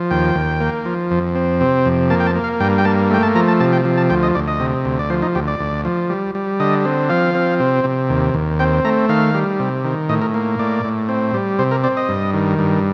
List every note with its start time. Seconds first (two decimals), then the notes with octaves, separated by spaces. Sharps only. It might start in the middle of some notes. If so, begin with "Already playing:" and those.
Already playing: F3
0.11 D#2 G5
0.35 D#2
0.60 A#3
0.85 F3
1.11 F2
1.35 C4
1.61 C3
1.85 F2
2.10 A#3 A5
2.20 G5
2.27 A5
2.35 A#3
2.44 F5
2.60 G2 G5
2.78 G5
2.85 A#3 A5
3.10 A3 G5
3.23 A5
3.35 F3 A#5
3.48 A5
3.60 C3 A5
3.73 G5
3.85 F3
3.97 A5
4.10 D2 G5
4.23 D#5
4.35 D2 D5
4.48 D#5
4.60 C3
4.85 D2
4.99 D5
5.10 F3 C5
5.22 D#4
5.35 D2 G4
5.48 D5
5.60 D2
5.85 F3
6.10 G3
6.35 G3
6.60 D3 D#5
6.85 C4
7.10 F3 F5
7.35 C4
7.60 C3
7.84 C3
8.10 D#2
8.34 D#2
8.59 C4 G5
8.85 A3 A#5
9.09 D#3 F5
9.34 G3
9.59 C3
9.84 D#3
10.09 A2 D#5
10.22 A#4
10.34 A#3
10.59 A2 D5
10.84 A2
11.09 C4
11.34 G3
11.59 C3 C5
11.71 A#4
11.84 C4 D5
11.97 D#5
12.09 G2
12.34 D#3
12.59 G2